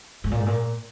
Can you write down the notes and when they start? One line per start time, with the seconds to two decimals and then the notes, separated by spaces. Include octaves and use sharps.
0.24 G#2
0.31 A#2
0.39 G#2
0.46 A#2